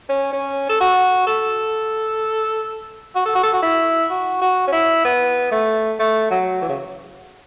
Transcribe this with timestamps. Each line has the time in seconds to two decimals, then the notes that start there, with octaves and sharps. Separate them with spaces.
0.09 C#4
0.33 C#4
0.69 A4
0.80 F#4
1.27 A4
3.15 F#4
3.25 A4
3.35 F#4
3.43 A4
3.53 F#4
3.62 E4
4.10 F#4
4.41 F#4
4.67 C#4
4.72 E4
5.04 B3
5.51 A3
5.99 A3
6.30 F#3
6.62 E3
6.69 C#3